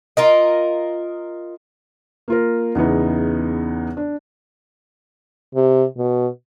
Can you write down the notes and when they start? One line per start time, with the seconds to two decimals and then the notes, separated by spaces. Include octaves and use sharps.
0.17 F4 A#4 D#5
2.28 A#3 F4 A#4
2.75 E2 C#3 E3 B3 D#4
3.97 D4
5.55 C3
5.97 B2